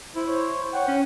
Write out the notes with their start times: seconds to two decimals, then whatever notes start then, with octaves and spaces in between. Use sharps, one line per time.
0.16 E4 C5
0.27 C5 C#5
0.74 C#5 F#5 G5
0.88 C#4